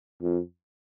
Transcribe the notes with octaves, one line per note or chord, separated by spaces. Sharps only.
F2